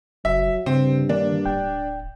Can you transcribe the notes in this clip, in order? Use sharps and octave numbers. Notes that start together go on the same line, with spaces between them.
F#1 F#3 E5
G2 C#3 C4
D#3 A#3 D4
D1 G5